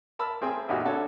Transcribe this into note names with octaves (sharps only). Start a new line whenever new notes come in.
A#4 A5 B5 E6 F6
A1 C4 G#4 G5
A1 E2 A#2 D#4 F#4 G4
D3 F#4 A4 C#5